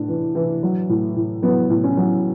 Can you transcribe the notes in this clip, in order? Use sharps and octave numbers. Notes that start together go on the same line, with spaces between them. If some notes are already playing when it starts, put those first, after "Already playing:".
Already playing: A2 D4
E3
E3
F#3
A2
A2
F#3 B3
A2
C#4
F#3